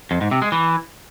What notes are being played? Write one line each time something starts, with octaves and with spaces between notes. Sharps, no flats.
F2
G#2
C3
G#3
E3